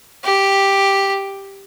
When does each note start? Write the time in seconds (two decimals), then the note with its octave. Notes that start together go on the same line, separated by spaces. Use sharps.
0.24 G4